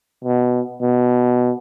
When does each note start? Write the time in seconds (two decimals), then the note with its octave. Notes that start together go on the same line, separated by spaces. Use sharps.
0.24 B2
0.81 B2